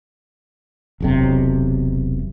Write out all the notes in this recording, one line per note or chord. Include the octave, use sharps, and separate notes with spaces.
E1 B1 C3